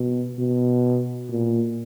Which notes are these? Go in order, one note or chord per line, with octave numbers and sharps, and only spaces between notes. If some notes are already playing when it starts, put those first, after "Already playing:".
Already playing: B2
B2
A#2